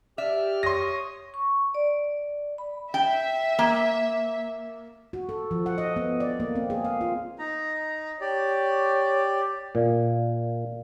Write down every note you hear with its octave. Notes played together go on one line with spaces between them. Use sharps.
G4 D5 E5 F6
C#5 C6 D#6 A#6
C#6
D5
B5
E5 G5
A#3
F#4
A4
F3
F#5
D#5
B3
D5
A#3
C4
G#4
F5
F4
D#4 A#5
G4 C#5 D5
A#2 A#4 D5 F5